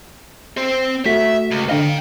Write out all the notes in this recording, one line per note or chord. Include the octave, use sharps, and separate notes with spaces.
C4 C5
A3 F#4 E5 B6
C#2
D3 D4 D#5 F5 G5